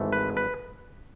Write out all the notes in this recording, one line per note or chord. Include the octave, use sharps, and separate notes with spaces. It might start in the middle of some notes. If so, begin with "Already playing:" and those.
Already playing: G#1 G#2 E3 A3
B4
B4